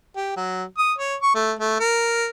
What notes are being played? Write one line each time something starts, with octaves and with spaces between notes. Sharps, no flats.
G4
F#3
D#6
C#5
C#6
A3
A3
A#4